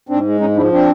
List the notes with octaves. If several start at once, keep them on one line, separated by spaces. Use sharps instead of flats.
G#2 C4 D4
G#3
G#2 C#4 D#4
F3 D4 E4
C4 D4